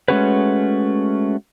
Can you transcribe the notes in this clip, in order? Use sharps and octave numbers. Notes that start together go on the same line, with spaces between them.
G#3 A3 C#4 F#4 G#4 B4